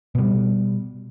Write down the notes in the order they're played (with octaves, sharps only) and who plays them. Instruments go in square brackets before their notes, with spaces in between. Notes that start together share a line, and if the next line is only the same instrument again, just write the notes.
[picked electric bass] B2 G3